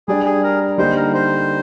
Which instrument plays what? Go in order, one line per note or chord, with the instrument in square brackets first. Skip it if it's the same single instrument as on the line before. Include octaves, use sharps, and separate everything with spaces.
[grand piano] G3 D4 G4 D5 [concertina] G#4
[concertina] G#4
A#4
[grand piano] D3 G3 A#3 D#4 G4 [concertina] C5
[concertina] A#4
C5